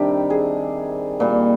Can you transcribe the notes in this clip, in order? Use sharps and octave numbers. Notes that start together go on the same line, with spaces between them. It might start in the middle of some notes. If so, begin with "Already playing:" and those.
Already playing: C3 D#3 G3 D4 G4
G#4
A#2 G3